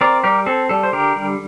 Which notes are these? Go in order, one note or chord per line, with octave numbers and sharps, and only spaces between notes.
C4 A#4 D5
G3 G4 A#4
C4 A4
G3 A4
C5
D3 G4 A#4
G3